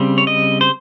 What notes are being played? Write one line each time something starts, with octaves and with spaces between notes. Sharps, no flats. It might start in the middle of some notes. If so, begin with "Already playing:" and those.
Already playing: C#3 G3 C4
C#5
D#5
C5